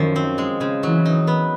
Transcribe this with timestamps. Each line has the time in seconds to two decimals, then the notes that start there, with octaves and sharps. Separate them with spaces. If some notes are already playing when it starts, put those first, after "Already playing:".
Already playing: F#2 D#3 F3
0.16 C4
0.38 G#3
0.61 C#3
0.83 E3 F#3
1.05 D#4
1.27 B3